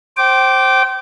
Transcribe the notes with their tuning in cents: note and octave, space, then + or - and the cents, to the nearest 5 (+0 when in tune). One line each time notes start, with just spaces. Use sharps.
C5 +15 G5 -30 D6 +0